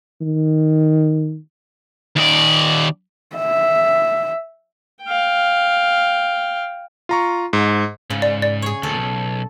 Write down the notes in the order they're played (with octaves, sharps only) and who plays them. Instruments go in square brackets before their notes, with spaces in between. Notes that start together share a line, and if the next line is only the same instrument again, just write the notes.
[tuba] D#3
[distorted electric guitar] D#2 D5
[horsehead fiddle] E5
[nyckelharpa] F5 G5
[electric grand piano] F4 A#5 C#6
G#2
[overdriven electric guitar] G#2 [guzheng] C#3
[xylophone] D5
D5
[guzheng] G#4 C#5
[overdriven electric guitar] D2 A#2 [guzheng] A4
[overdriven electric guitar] B1